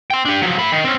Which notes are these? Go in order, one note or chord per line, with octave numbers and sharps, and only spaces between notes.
G5 C6
D4 G4
F3 F#3
A3 B5
D#3
C4 C#4